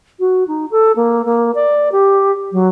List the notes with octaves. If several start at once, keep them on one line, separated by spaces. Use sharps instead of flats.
F#4
D#4
A4
A#3
A#3
D5
G4
F#3